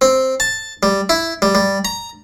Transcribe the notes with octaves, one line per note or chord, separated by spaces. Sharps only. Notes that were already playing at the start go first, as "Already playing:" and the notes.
C4
A5
G3
E4
G3
G3
A#5